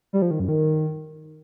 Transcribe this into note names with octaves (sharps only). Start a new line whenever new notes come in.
G3
F3
D#3
F#2
D#3